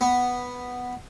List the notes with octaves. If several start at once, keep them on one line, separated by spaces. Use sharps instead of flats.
B3